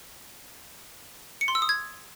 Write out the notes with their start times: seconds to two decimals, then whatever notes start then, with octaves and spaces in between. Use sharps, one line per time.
1.41 C#7
1.48 C6
1.55 E6
1.62 D#6
1.69 G#6